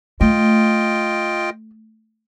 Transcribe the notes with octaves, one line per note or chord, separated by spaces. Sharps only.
A3 F4 D#5 G5